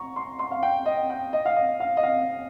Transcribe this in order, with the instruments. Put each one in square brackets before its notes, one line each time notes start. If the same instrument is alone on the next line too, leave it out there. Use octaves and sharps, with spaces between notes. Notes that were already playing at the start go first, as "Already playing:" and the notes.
Already playing: [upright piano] A#5 C#6
C6
C6
F5
G5
D#5
G5
D#5
F5
D#5
F5
D#5
F5